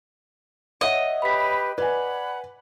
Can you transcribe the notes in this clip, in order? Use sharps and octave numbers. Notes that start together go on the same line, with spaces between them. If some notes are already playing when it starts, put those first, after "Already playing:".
C#5 D#5 E5 F#5
G4 B4 B5 B6
B4 D5 F#5 G#5 B5